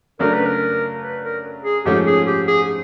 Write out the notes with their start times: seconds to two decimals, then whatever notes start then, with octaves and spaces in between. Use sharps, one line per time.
0.19 C#3 F#3 A3 D4 A#4
0.33 B4
0.46 A#4
1.03 B4
1.23 A#4
1.65 G#4
1.85 G#2 F3 A3 C#4 G4
2.07 G#4
2.27 G4
2.47 G#4